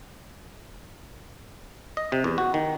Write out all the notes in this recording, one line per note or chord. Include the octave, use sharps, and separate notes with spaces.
D#5
C3
E2
F#4
D#3